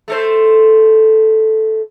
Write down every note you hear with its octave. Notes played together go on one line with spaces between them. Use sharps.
A3 A4 C5